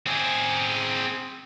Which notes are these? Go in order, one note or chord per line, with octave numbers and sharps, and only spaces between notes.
C4 G#4